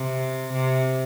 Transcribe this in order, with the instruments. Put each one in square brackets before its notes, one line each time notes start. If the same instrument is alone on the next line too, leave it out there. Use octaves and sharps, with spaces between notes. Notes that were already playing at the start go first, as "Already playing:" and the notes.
Already playing: [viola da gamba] C3
C3